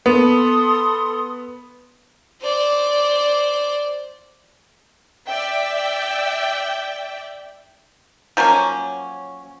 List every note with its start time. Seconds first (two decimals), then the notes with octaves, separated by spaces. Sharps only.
0.06 B3 A4 C6 D#6
2.42 C5 D5
5.28 D5 E5 G5
8.37 F3 F#3 A#3 C#4